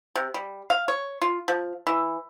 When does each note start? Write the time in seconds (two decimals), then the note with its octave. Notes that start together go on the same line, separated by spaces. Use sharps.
0.15 C3
0.34 G3
0.70 F5
0.88 C#5
1.22 F4
1.48 F3
1.87 E3